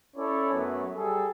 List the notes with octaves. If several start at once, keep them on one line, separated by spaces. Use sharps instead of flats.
C#4 E4 A4 C#5 D5
F#2 F#3 A3 B3
G3 G#4 A4